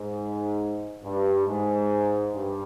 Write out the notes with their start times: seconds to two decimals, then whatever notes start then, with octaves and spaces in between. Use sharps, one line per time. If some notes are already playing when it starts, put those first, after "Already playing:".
Already playing: G#2
1.03 G2
1.47 G#2
2.34 G2